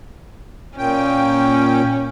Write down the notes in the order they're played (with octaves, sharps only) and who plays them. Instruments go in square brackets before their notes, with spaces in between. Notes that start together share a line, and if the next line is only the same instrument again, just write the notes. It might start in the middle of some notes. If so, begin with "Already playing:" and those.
[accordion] A#2 G5 [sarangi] C#4